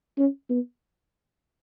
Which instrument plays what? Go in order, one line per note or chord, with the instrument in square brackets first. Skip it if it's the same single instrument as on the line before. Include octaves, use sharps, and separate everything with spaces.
[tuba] C#4
B3